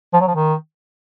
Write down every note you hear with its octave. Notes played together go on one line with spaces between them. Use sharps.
F3
F#3
F3
D#3